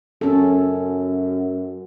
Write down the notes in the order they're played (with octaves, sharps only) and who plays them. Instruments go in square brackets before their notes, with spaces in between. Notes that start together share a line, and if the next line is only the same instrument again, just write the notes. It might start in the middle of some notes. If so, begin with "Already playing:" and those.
[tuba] F#2 [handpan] C#4 A4